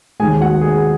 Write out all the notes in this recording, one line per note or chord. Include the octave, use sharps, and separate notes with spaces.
D#2 D#3 G#3 G#4 G#5
F#4 F#5
G#4